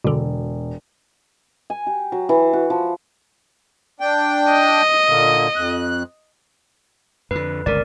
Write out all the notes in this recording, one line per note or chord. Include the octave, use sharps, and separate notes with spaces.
E1 B2 D3
G#5
G4
F#3
E3
F#4
F3
D4 G5
D#5
A#2 D3 A#3
F2 F#6
F2 D3 B4
G1 C#2 C3 A#4 D5